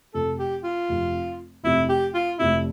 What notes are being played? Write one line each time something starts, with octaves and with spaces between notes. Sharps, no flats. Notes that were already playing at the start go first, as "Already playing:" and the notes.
F1 F2 C3 A4
G4
F4
F1 F2 C3
F1 F2 C3 E4
G4
F4
F1 F2 C3 E4